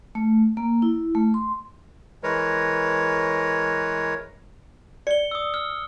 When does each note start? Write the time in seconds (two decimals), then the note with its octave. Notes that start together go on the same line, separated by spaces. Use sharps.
0.15 A3
0.57 A#3
0.82 E4
1.15 A3
1.34 C6
2.23 E3 G#3 A#4 B4 C#5
5.07 D5 C#7 G7
5.31 D#6 E6
5.54 F6